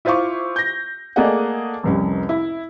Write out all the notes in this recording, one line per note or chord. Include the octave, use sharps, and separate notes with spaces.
E4 F4 C5 F5 C#6 D6
G6 A#6
A3 A#3 G#4 D5 D#5 F#5
F1 C2 C#4
E4